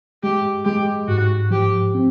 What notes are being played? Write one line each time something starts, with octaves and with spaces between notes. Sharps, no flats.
G#3 G4
G#3 G4
G#2 F#4
F3 G4
C4